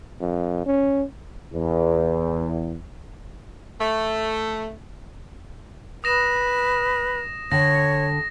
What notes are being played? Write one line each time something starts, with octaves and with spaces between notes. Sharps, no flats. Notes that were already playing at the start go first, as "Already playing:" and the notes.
F2
C#4
E2
A3
B4 D#6 A#6 E7
D3 C#5 G5 A#6